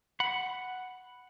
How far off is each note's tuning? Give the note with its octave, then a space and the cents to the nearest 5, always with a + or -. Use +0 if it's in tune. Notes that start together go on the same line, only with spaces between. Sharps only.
F#5 +0 B5 +0